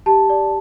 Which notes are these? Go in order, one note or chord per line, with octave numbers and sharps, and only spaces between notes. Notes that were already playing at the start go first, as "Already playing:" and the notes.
G4 A5
D5